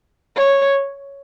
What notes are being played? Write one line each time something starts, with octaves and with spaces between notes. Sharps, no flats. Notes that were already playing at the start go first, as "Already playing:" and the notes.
C#5